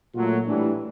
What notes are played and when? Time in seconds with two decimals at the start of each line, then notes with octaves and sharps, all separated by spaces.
0.14 A#2 F#3 A3 F4
0.46 A2 E3 G3 D4